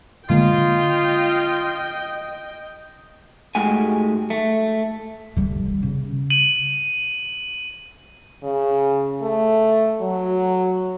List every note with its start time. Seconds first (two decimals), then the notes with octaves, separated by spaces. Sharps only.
0.30 D3 G#3 A#3 F4 D#5 G5
3.55 G#2 G#3 A3 F#4 G4 G#5
4.30 A3
5.37 D3 G3
5.66 D#3
5.83 C#3
6.30 D#7 F#7
8.43 C#3
9.22 A3
10.01 F#3